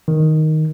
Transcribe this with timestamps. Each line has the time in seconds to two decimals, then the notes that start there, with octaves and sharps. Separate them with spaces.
0.08 D#3